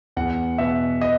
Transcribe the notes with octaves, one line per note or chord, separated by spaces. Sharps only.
E2 F#5
B2 E5
D#5